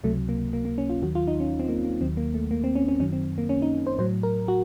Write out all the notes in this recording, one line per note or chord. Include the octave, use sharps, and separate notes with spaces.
C#2 C3 F#3 A3
A#3
A#3
A#3
C#4
F4
D#2 D#3 F#3 F#4
F4
D#4
C#4
C4
A#3
A#3
D#2 D#3 F#3 C4
A#3
A3
A#3
C4
C#4
C#4
F#2 D#3 F#3 C#4
C4
A#3
C#4
D#4
C5
A2 F#3 C5
A#4
F#4